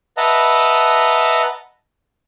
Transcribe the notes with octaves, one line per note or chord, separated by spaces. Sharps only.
B4 D#5 E5 F#5 A5 A#5